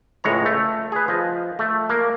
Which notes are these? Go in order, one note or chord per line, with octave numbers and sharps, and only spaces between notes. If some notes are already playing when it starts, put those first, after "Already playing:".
C#2 A2 G#3 C#5 A#5
A3
G#4 B4
F3 D#5
A3
A#3